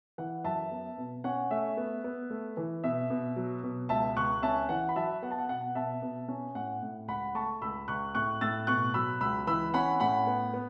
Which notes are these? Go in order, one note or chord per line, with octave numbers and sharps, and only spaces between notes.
E3 F#5
F#2 E5 A5
B3
B2
C#4 F#5
A3 E5
B3
B3
A3
E3
B2 E5
B2
F#3
B2
C#2 E5 A5
C#2 C#6 F#6
C#4 E5 A5
E3 F#5
B5
F#3 E5 A5
B3 F#5
A5
F#5
B2 F#5
B2 E5 A5
B2
C#4
A2 F#5
A2
C#2 F#5 B5
A3 A5 C#6
C#2 B5 E6
C#2 C#6 F#6
A2 C#6 F#6
A2 E6 A6
B2 C#6 F#6
F#3 B5 E6
C#2 B5 E6
E3 B5 E6
C#4 F#5 B5
A2 F#5 B5
B3
B3